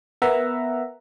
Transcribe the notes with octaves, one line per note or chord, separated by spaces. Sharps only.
B3 A#4 E5 F#5 A#5